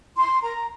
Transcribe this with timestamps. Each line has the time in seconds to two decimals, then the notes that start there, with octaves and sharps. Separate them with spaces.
0.15 E4 C6
0.42 A#4 A#5